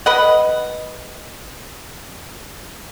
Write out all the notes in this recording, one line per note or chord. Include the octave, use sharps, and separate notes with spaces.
B4 D#5 F#5